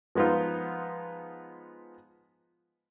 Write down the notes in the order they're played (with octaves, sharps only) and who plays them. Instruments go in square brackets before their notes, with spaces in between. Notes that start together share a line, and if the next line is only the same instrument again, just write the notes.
[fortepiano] F3 G#3 B3 D#4 F4